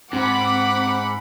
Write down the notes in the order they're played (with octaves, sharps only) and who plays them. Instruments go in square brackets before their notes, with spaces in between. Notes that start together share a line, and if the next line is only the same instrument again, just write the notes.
[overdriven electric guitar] G#2 [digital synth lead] C4 [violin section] F#5 B5 [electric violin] D6